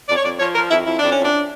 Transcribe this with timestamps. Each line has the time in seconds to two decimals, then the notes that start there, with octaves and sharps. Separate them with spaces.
0.08 F2 D5
0.16 C#5
0.24 F2 D5
0.40 F3 C#5
0.55 F3 A#4
0.71 F2 E4
0.86 F2 E4
0.99 F2 D4
1.12 C#4
1.17 F2
1.25 D4